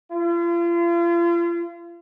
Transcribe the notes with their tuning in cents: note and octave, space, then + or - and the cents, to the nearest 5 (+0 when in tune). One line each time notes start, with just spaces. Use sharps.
F4 -40